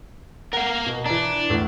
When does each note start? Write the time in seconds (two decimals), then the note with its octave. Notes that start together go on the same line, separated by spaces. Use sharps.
0.53 A#4 F5 F#5
0.86 B2
1.06 E3 D4 A#5
1.50 E2 A2 E3